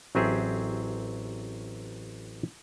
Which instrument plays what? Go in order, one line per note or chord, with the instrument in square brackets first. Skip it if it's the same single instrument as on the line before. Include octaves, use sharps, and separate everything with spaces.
[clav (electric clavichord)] A1 F#3 C4 G4 G#4 E5